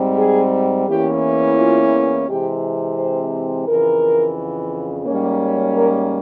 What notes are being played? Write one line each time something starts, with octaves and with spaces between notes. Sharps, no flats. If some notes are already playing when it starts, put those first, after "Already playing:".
Already playing: G#2 G3 C4
G#4
E2 E3 A#3 C#4 G4
F4
C3 E3 G#3 C4 G4
C5
F2 C#3 E3 A#4
G#2 G3 A#3 C#4
A#4